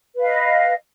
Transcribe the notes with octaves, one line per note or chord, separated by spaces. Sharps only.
B4 D#5 F5